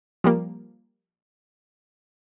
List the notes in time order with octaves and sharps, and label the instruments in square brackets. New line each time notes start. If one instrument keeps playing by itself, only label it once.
[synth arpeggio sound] F3 G3 A#3